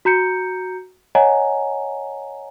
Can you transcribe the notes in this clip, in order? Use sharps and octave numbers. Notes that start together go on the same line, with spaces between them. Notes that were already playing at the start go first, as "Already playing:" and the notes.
F#4 A#5 G6 C#7
C#5 D#5 F#5 G#5 A#5